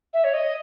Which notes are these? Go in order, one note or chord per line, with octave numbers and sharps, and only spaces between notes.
E5
C#5
D#5